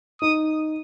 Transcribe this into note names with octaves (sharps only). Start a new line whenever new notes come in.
D#4 D#6